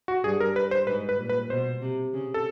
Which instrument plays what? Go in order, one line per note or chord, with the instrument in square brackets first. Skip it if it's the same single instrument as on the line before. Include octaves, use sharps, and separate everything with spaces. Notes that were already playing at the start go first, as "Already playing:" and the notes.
[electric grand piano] F#4
[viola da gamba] G2 [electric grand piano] G#4
[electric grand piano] A#4
B4
C5
[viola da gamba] G#2 [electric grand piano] B4
[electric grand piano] B4
[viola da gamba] A#2
[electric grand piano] B4
[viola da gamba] B2 [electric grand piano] C5
[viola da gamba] C3
C#3
[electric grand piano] A4